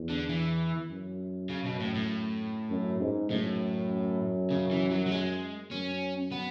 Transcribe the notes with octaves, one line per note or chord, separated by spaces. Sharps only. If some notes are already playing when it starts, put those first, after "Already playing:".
Already playing: E2
D3
E3
F#2
C#3
B2
A2
A2
F#2
G#2
F#2 A2
C#3
E3
F#3
F#3
G#3
F#2 C#4
B3